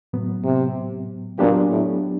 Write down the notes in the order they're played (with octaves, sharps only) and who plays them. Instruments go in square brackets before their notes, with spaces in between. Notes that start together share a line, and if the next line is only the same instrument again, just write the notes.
[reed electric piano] A2 F#3 B3
[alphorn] C3
[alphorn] A#2 [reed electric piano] F#3 B3 D4 G4
[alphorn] A2